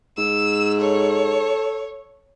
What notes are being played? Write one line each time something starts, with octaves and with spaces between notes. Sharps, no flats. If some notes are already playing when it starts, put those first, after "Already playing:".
G#2 E6
A4 C#5